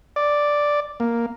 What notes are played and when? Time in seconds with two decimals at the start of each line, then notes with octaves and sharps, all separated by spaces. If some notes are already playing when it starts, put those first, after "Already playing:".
0.16 D5
1.00 A#3